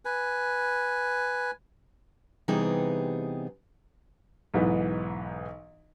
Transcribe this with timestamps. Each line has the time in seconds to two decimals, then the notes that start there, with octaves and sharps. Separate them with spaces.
0.05 B4 G#5
2.48 C3 E3 G3 B3 D#4 G#4
4.54 B1 G#2 E3 B3